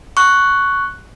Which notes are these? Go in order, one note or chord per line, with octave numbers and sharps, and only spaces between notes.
C#6 F#6